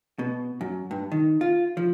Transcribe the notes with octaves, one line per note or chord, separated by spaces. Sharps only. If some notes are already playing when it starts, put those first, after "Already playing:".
B2
F#2
G2
D#3
F4
F3